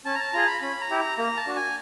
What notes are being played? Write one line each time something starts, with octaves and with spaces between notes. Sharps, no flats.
C#4 A5
A#5
A5
F4 G#4 A#5
B5
C#4 B5
A#5
E4 G4
A#5
A#3 A#5
A5
D4 F#4
G#5